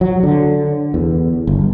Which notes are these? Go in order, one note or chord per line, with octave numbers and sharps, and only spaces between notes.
F#3
D3
E2
G1